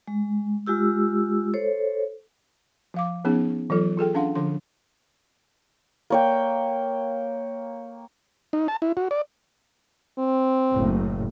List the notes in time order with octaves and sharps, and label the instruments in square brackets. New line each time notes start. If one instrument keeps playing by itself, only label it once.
[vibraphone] G#3
G#3 F4 G4 E6
A4 C5 C#5
[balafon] F3 F5 D6
F3 B3 C#4 D#4 G#4
E3 F#3 F4 A4
F4 G#4 A4 G5
C#4 D4 F5 F#5 C6
D3 F3 D4 C6
[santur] A#3 C#5 G5
[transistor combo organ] D#4
A5
E4
F#4
D5
[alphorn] C4
[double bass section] F#1 A2